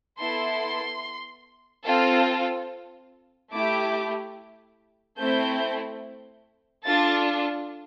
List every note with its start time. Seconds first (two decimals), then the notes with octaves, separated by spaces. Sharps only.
0.19 B3 E4 A4 C6
1.85 C4 F4 A4
3.52 A3 E4 G4 D6
5.18 A3 C4 E4 G6
6.84 D4 F4 A4 A6